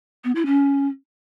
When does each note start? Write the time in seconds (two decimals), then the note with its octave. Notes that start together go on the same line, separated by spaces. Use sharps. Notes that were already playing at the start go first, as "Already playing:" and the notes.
0.24 B3
0.35 E4
0.46 C#4